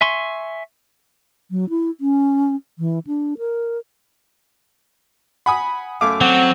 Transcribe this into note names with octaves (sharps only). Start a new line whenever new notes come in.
E5 G#5 C6 C#6
F#3
E4
C#4
E3
D4
A#4
F#5 G#5 B5 D#6
F#2 A3 F5 D6
F#3 C4 F#5